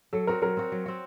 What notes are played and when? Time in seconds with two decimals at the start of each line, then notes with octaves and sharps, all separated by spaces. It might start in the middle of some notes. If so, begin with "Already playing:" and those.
0.13 F#3 A4
0.27 C4 F#4 A#4
0.42 F#3 A#4
0.57 C4 F#4
0.72 F#3
0.86 C4 F#4